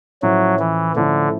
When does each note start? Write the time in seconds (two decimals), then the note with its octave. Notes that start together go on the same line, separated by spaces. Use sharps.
0.22 A2 F3 F#3 A3 C#4 E4
0.60 E3
0.95 A2 D3 F3 A3 C#4 E4